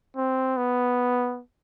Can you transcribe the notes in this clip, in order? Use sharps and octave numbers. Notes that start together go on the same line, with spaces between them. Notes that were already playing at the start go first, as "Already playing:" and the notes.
C4
B3